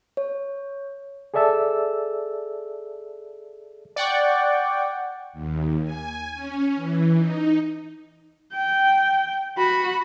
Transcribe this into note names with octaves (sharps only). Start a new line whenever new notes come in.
C#5
G#4 A4 D5 E5 A5 E6
D5 F#5 G5 C#6
D#2
G#5
C#4
E3
D#4
G5
F#4 B5